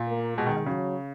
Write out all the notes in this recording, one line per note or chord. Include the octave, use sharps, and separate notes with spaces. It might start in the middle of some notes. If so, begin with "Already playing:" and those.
Already playing: A#2
A#3
B2 G#3
D#3
D#3
C#3 F#3